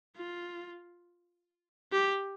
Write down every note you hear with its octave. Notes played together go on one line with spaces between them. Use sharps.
F4
G4